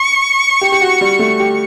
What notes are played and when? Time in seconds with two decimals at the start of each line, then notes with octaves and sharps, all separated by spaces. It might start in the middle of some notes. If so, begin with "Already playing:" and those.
Already playing: C#6
0.61 G4
0.72 G4
0.81 F#4
1.01 G3
1.19 A3
1.40 G4